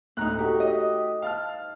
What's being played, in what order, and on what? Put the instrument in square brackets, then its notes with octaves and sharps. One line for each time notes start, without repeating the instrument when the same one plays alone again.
[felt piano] D2 A2 A#5 [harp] D#4 F#6
[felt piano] A3 F#4 G4
[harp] D#5
[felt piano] F5 A5 F6